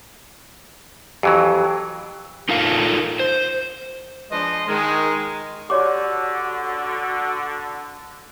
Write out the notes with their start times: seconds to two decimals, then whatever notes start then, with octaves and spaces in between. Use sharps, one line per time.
1.23 F2 E3 F#3 G4
2.49 D#4 F4 A4 A#4 F5
3.20 C5
4.31 F3 G#3 D4 B4 D#5 C6
4.67 D#3 G#3
5.70 D3 F#4 G4 C#5 D5 D6